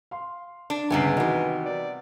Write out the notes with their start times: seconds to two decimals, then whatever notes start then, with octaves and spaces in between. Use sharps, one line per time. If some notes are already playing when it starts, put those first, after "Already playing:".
0.11 F5 C6
0.70 D4
0.90 G1 C#2 C3 G3 B3 G#5 C7
1.17 D#3 E3 F#4 D#5
1.65 D5